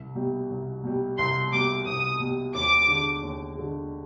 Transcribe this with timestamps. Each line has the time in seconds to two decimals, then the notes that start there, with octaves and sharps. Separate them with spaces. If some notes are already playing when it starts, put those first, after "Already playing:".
Already playing: C2
0.15 B2 G3
0.50 C2
0.83 B2 G3
1.18 C2 C6
1.52 B2 G3 D6
1.86 C2 D#6
2.20 B2 G3
2.54 D#2 D6
2.88 D3 G#3
3.23 D#2
3.57 D3 G#3